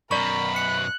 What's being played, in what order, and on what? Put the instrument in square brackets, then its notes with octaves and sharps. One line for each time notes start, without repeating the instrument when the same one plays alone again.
[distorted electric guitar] F#2 B2 [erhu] A#4 [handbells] D5 C#6 [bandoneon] B5
[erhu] F#6 [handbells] C#7